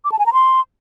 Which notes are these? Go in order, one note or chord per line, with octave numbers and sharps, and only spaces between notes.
D6
A5
G#5
A#5
C6